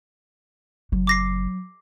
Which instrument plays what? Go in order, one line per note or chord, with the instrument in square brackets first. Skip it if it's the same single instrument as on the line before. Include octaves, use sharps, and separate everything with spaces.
[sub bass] F#1 [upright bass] F#3
[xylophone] D6 A#6 C7